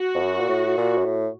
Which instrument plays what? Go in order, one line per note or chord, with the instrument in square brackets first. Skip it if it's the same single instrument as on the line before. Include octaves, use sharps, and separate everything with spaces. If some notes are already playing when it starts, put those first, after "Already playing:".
Already playing: [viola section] F#4
[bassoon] F2
F#2
A#2
A2
A#2
F#2
A2